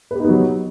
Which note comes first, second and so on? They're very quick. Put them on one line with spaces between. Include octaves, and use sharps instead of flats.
B4 G4 D#4 B3 F#3